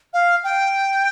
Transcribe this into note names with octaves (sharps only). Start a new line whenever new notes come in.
F5
G5